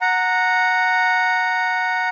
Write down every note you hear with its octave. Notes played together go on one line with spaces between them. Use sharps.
F#5 A#5